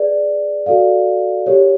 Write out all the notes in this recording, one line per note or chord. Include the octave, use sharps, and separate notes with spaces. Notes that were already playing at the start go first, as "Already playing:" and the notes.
Already playing: G#4 B4 D5
F#4 A4 D5 F5
G4 A#4 C#5